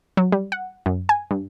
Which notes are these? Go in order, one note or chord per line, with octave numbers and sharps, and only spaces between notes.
F#3
G3
F#5
F#2
G#5
G2